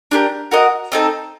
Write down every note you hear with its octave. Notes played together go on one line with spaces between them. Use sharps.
D4 G4 A#4
F#4 A#4 D#5 F#5
C4 D#4 A4